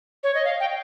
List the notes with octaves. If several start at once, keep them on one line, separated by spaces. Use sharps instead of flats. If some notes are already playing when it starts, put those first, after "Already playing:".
C#5
D#5
F5
G5